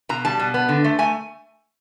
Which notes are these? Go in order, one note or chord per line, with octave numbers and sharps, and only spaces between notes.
B2 A#5
G3 A5
B2
B3
D3
A3
A3 G#5